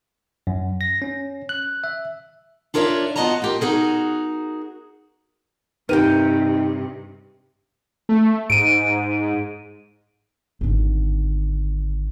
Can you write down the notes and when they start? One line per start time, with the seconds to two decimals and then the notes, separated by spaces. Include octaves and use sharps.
0.47 F#2
0.81 A#6
1.02 C#4
1.49 F#6
1.84 E5
2.74 D4 F4 A#4 C#5 D5 E5
3.16 B3 F4 F#4 D#5 A5 A#5
3.42 F4 G4 A#4
3.61 D#4 F#4 G#4 A#4
5.89 G2 C3 D#4 G4 A#4 B4 G5 D#7
8.09 A3
8.50 G#2 D7 D#7
10.61 G#1 D3